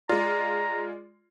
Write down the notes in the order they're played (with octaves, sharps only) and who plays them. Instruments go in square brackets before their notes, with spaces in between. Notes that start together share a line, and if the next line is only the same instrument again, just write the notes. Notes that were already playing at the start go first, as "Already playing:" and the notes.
[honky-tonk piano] G#3 F4 [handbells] D5 [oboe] A#5